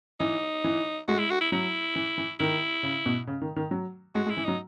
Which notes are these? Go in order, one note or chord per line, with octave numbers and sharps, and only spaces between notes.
E3 D#4
E3
G#3 F#4
E4
F#4
E4
F#3 E4
E3
E3
D#3 E4
C#3
B2
C#3
D#3
D#3
F#3
G#3 F#4
G#3
E4
E3
F#3 D#4